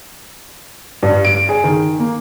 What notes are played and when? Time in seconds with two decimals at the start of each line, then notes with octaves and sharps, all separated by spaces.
1.03 G2
1.25 D7
1.49 G#4
1.64 D#3
1.99 A#3